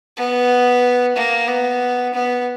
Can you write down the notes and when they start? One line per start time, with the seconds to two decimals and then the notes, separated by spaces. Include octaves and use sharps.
0.17 B3
1.16 A#3
1.48 B3
2.14 B3